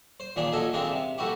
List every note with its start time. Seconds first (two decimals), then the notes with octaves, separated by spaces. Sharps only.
0.20 C5
0.36 A#2 D#3 A#3 D4 G#4
0.52 A#1 F3 F#3 A4 D#5 G#5
0.73 D#3 G#3 A#3 C4 D4 G4
0.90 C3
1.18 A3 A#3 E4 F#4 G4